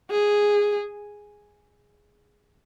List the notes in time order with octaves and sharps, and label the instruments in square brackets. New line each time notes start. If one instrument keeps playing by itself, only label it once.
[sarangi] G#4